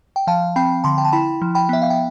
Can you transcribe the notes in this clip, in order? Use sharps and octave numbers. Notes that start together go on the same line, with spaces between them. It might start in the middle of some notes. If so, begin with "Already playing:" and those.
G5
F3 F5 A5
C4 G5 B5
D3 A5 C6
G5
A5
E4 G5 B5
F3
G5 B5
B3 E5
F5
G5